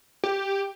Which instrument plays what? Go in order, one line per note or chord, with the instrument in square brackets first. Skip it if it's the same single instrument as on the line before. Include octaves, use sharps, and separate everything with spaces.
[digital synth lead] G4